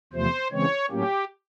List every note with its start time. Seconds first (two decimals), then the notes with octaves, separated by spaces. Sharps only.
0.13 E2 C3 F3 A3 C5
0.52 C#3 E3 G#3 C4 C#5
0.90 A2 F#3 A#3 C#4 G4